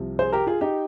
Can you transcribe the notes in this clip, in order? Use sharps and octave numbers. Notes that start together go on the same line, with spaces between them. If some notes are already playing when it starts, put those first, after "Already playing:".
Already playing: C2 C3 F3
G#4 C5
G4 A#4
F4 G#4
D#4 G4